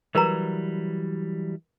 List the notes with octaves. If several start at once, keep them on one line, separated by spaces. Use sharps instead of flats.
E3 F#3 G3 A#4 B4 A#5